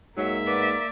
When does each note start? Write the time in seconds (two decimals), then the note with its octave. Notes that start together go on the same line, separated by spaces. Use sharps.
0.17 G#2 F#3 A#3 E5
0.47 B3 D5